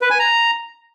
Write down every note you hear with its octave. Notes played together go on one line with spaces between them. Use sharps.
B4
G#5
A#5